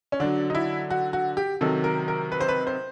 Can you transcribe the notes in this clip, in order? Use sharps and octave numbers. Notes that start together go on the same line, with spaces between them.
C#4
D3 F#3 D4
D#4
E4
F#4
F#4
G4
C3 D#3 F#3 A4
A#4
A#4
B4
C5
B4
C5